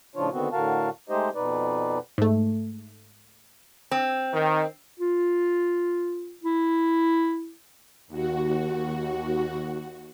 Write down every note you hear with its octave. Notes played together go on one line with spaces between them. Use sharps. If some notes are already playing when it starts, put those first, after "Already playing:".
A2 C#3 F3 D4 F4 C#5
D3 D#3 B3 C4 F#4
A2 D3 F#4 A#4 F5 A5
G#3 A3 D#4 G4 C5 D#5
F2 B2 D#4 B4 D5
G#2 A3
C4
D#3
F4
E4
D#2 F#4